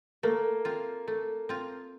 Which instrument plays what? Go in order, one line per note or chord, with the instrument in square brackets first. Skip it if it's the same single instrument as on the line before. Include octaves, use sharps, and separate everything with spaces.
[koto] A3 [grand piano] A#3
[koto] C4 F4
A3
C4 F4